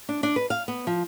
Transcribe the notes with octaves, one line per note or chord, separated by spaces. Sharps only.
D4
D4
B4
F5
B3
F3